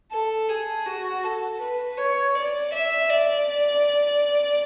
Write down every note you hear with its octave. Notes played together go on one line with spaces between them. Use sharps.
A4
G#4
F#4
A4
B4
C#5
D5
E5
D5